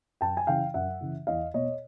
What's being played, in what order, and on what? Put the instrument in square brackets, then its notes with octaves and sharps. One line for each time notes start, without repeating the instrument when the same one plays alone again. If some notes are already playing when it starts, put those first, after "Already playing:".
[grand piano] F#2 G5 A5
G#5
C#3 E3 F5 G5
F#2 E5 F#5
C#3 E3
E2 D#5 F5
B2 C#5 D#5